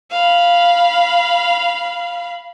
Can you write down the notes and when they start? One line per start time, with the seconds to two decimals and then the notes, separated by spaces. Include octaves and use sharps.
0.11 F5 B5